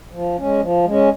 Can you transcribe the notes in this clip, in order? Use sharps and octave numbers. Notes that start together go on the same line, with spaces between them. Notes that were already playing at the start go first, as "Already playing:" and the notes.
F3
G#3 C#4
F3
G#3 C#4